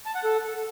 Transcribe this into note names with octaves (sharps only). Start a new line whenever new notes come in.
A5
F#5
A4